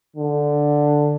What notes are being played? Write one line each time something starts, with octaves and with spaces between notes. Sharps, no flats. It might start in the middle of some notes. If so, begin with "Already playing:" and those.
D3